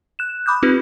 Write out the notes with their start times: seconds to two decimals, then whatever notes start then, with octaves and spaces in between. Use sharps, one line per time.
0.19 F#6 E7
0.46 B5 D6 D#6 F#6 G6
0.63 C4 D#4 F4 G4 B4